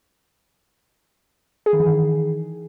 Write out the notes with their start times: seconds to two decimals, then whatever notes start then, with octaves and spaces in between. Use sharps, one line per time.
1.66 G#4
1.73 D#3
1.80 E3
1.87 D#3